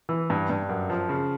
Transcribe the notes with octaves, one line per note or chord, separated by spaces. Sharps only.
E3
G2
G2
F#2
F3
C#3